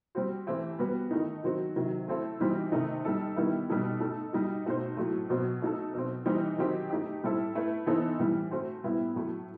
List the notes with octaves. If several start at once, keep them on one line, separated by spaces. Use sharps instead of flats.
G3 C4 F#4 C5
E3 A3 C4 E4 G4
G3 B3 F#4 B4
D#3 A3 D#4
D#3 F#3 C4 F#4
C3 D#3 F#3
A3 C4 E4 A4
E3 G3 C4 D#4 F#4
C3 D#3 A3 D#4
G3 D#4 A4
D#3 G3 B3 E4
B2 G3 D#4 A4
A3 D#4 A4
G3 D#4 F#4
B2 A3 D#4 F#4 C5
A2 F#3 A3
B2 F#3 C4 F#4
A3 D#4 F#4 A4
B2 F#3 C4
E3 G3 C4 D#4
D#3 F#3 C4 D#4 G4
A3 D#4 G4
A2 G3 C4 E4 A4
A3 E4 B4
E3 B3 D#4 A4 C5
A2 E3 G3
A3 C4 F#4 C5
A2 G3 B3 E4
A2 F#3 A3